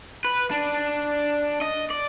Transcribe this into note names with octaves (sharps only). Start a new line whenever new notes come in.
B4
D4
D#5
D5